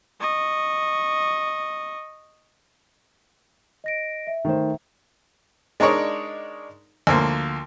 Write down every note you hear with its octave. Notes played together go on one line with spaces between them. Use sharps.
D#5 C#6
D#5 A#6 D7
E5
D#3 A3 C5
G#3 D4 D#4 A#4 C#5 D5
D2 F3 A#3